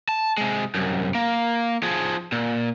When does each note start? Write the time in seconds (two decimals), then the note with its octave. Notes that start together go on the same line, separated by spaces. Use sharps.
0.09 A5
0.38 C3 G#3
0.75 C2 F#2
1.15 A#3
1.83 F3 G#4
2.32 A#2